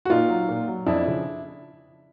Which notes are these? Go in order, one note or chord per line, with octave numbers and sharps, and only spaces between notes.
F#4
A#2 D#4 F4
F#3
A#2
F#3
F2 D4 E4
C#3 F3